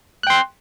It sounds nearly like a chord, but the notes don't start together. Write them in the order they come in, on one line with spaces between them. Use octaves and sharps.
F#6 G5 C6